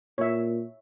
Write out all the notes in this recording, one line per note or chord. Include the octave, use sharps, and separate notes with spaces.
A#2 C#5 E5